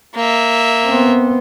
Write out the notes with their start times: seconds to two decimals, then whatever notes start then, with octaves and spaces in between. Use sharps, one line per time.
0.15 A#3 E5
0.85 B3 C4